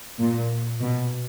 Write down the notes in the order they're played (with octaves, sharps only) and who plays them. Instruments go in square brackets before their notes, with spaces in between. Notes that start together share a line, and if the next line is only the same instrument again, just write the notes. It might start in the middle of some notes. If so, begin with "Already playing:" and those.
[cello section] A#2
B2